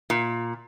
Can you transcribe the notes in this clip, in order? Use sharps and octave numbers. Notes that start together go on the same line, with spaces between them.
A#2